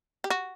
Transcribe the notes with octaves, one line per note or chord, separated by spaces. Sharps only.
G4
F#4